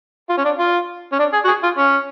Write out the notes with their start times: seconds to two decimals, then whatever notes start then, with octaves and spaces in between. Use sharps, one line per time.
0.30 F4
0.37 C#4
0.45 D4
0.59 F4
1.12 C#4
1.19 D4
1.33 G#4
1.45 F#4
1.48 G#4
1.63 F4
1.78 C#4